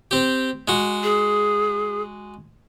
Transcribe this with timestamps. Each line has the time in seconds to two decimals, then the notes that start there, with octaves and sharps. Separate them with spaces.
0.11 C4 G4
0.68 G#3 F#4
1.03 G#4